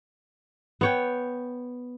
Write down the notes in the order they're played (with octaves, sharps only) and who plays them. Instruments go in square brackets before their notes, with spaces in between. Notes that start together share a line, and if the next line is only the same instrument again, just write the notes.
[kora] B3 C#5 G5